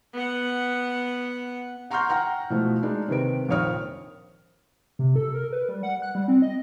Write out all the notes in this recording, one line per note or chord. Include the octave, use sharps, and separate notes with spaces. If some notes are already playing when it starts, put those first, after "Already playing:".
B3 F#5
F#5 A#5 C6 C#6 F6 G6
F#5 G5 A#5 F6
B2 E3 F3 A3
G#3 D4 D#4
C3 D#3 B4 D7
A#1 F2 D#3 C#5 D#6 F6
C3
A4
A#4
B4
G3
F#5
F#6
G3
C4
D#5